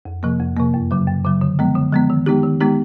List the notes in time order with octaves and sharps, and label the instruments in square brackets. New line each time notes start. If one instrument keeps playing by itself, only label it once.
[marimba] F2
C3 F3 A#3
F2
C3 F3 A#3
F#2
C#3 F#3
F#2
C#3 F#3
D3
F3 G#3 B3
D3
F3 G#3 B3
D#3
G#3 B3 D#4 G4
D#3
G#3 B3 D#4 G4